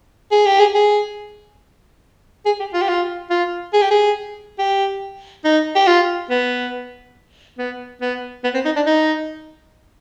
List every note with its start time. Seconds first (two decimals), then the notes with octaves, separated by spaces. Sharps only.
0.31 G#4
0.46 G4
0.60 G#4
0.74 G#4
2.46 G#4
2.60 G4
2.74 F4
2.82 G4
2.89 F4
3.30 F4
3.74 G#4
3.82 G4
3.91 G#4
4.59 G4
5.44 D#4
5.75 G4
5.87 F4
6.30 B3
7.58 B3
8.01 B3
8.44 B3
8.54 C4
8.65 D#4
8.76 D4
8.86 D#4